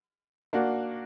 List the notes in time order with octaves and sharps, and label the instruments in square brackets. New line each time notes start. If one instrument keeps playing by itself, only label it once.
[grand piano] A#3 D4 F#4